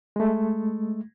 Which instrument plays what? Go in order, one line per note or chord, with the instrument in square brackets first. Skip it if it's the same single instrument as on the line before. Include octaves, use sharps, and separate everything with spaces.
[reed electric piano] G#3 A3